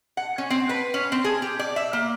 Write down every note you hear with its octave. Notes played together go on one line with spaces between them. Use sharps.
F#5
C#4
C4
B4
C#4
C4
G#4
G4
D5
E5
A#3